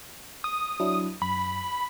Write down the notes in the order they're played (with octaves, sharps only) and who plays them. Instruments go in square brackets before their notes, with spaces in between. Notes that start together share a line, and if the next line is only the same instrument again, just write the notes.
[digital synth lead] D#6
[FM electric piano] F#3 D4 E4
[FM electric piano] F#2 [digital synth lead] B5